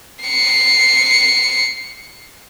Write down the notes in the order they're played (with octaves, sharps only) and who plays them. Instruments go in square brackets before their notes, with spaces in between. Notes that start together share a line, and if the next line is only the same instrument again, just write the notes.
[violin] C7 C#7